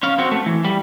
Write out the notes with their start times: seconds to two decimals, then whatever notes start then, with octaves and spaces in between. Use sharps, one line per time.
0.03 C#4 F5
0.18 C4 F#4
0.31 A3
0.46 E3
0.65 G3